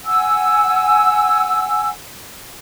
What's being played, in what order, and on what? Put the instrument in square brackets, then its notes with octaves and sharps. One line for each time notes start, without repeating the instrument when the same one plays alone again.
[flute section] F#5 G#5 E6